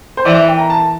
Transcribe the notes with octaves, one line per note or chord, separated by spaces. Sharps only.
C5
E3 D5
E5
G5
A#5
A5